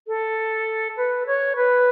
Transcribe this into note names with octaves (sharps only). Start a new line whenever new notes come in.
A4
B4
C#5
B4